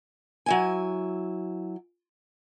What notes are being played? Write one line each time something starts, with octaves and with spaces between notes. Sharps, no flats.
F#3 E4 G#5